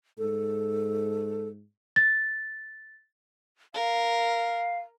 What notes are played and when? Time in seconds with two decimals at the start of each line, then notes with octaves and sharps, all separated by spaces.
0.18 G#2 A4
1.96 A6
3.74 A#4 F5